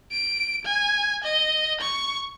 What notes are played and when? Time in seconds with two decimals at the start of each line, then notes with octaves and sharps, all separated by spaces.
0.12 D7
0.65 G#5
1.24 D#5
1.80 C#6